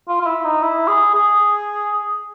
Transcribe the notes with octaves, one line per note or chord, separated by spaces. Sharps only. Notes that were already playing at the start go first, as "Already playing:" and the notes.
F4
F4
E4
D#4
E4
G#4
G#4